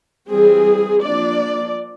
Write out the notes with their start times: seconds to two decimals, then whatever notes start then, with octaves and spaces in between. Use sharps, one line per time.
0.30 E3 G3 C4 G#4
1.04 F3 A#3 D4 D5